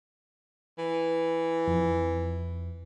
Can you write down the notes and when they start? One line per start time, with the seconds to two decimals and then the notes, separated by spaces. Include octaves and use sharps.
0.78 E3
1.67 F2